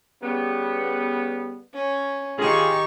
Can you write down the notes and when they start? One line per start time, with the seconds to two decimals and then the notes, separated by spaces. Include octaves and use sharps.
0.23 C#3 G3 B3
1.73 C#4
2.38 D#3 F4 G4 G#4 C#6